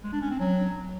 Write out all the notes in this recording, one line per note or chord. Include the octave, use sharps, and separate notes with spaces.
G#3
D4
C#4
C4
F#3